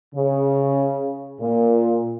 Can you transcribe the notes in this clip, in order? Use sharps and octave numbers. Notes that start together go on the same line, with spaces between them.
C#3
A#2